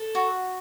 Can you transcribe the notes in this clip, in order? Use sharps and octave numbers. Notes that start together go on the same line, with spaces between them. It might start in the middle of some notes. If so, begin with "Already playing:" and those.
Already playing: A4
F#4